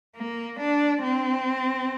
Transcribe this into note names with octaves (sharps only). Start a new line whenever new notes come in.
A#3
D4
C4